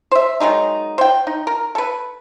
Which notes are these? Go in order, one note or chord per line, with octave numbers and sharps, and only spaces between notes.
C5 E5
D#3 F#3 G#3 D#4
C5 G5
D#4
A#4
A4 B4